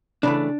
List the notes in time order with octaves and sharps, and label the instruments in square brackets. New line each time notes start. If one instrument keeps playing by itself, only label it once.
[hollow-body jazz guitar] C#3 E3 A3 D4 D5